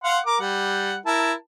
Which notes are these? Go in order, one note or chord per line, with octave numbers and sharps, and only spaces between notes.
F5 F#5 C6
A#4 D6
G3 F#5
E4 A#4 A5